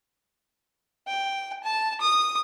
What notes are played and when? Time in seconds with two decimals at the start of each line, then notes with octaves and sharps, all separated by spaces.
1.07 G5
1.63 A5
2.00 D#6